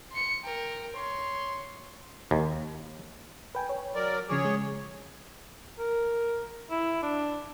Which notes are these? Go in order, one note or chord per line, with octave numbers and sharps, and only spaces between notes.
C6 C#7
A#4 G5
C#5 C6
D#2
B4 G5 G#5
C#5
F#3 A#4 D5
C#3 F3 G#4 C#5 D6
G#3
A#4
E4
D4